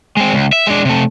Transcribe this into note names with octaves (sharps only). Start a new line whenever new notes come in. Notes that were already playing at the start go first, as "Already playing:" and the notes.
G#3 C4
C#2
E5
G#3 D4
C3 A3